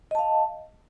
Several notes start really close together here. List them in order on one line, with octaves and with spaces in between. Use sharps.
D#5 A5 F5